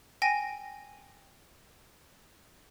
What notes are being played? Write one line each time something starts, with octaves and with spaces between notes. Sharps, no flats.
G5 G#5 A#6 D#7